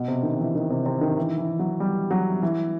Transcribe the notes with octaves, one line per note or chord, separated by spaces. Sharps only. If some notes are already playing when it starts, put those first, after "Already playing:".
Already playing: B2
C3
D#3
E3
D#3
C3
C3
D#3
E3
E3
F#3
G3
F#3
E3